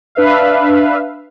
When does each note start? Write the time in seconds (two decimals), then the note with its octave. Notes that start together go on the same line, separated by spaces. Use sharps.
0.15 D4 B4 E5 F5